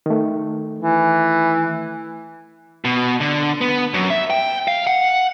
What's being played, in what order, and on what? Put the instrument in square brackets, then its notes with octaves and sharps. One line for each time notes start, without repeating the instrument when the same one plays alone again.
[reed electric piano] D#3 A3
[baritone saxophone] E3
[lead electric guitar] B2
D3
B3
F#2
E5
G5
F5
F#5